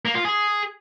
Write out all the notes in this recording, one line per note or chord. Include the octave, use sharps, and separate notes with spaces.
A#3
F4
G#4